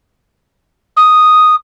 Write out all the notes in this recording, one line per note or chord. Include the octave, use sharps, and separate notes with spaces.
D#6